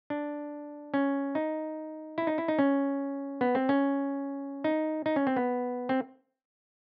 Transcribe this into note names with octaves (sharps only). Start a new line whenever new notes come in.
D4
C#4
D#4
E4
D#4
E4
D#4
C#4
B3
C4
C#4
D#4
D#4
C#4
C4
B3
C4